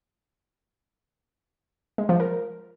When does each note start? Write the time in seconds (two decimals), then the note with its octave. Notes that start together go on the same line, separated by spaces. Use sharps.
1.98 G#3
2.09 F3
2.20 A#4